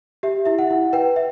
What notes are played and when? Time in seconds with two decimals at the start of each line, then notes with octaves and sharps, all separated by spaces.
0.23 G4 E5
0.45 E4 E5
0.59 F#5
0.71 E4
0.93 B4 G5
1.16 E5